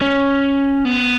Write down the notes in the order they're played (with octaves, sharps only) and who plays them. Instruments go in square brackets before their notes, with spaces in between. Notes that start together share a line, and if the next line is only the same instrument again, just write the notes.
[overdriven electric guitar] C#4
B3